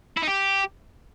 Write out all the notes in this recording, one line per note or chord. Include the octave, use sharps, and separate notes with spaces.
E4
D#4
G4